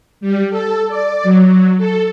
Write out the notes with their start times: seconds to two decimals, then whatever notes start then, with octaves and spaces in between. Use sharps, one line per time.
0.21 G3
0.50 A4
0.88 D5
1.23 F#3
1.78 A4